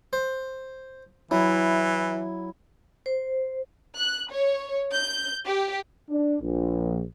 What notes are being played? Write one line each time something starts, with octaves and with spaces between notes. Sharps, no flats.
C5
E3 F#3 E4
C5
F#6
C#5
G6
G4
D4
A#1